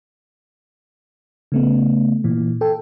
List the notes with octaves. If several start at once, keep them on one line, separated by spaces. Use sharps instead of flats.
C#3 A3 B3
A#2 E3
A4 G5